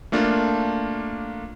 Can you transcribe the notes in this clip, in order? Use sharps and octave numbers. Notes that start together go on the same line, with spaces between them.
A3 A#3 D4 F4